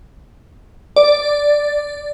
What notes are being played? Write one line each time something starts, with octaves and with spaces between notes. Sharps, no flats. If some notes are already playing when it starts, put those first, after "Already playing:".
D5